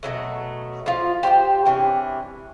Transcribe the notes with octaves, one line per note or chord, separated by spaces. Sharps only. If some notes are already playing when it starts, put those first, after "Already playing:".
B2 D#3 F#3 A3
F3 F4
G4 C5 F5 G5
C3 E3 C#4 D4